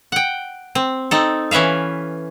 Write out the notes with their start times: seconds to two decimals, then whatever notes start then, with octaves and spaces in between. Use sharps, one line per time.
0.12 F#5 G5
0.75 C4
1.11 C4 D#4 A4
1.51 E3 C#4 B4 E5 F5